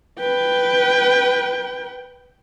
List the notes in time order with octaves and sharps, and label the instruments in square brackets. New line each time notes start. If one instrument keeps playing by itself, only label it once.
[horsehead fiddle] B4 G5